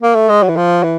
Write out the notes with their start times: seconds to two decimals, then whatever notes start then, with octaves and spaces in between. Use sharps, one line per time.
0.02 A#3
0.15 A3
0.29 G#3
0.43 F#3
0.49 E3
0.57 F3
0.83 E3